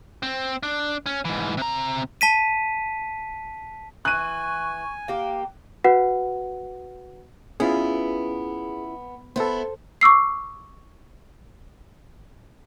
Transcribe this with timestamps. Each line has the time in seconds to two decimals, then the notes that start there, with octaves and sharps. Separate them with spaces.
0.23 C4
0.63 D4
1.06 C#4
1.25 G#2 E3
1.57 C3 A#5
2.21 A5 B6 D#7
4.05 E3 G#5 C#6 F#6 D#7
5.08 A#3 G4 F5
5.84 F#4 B4 F#5
7.60 B3 C#4 E4 F4 G#4
9.36 B3 E4 A4 C5
10.01 C#6 D6 E6 C7